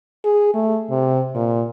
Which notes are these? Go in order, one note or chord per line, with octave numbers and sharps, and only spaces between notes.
G#4
A3
C3
A#2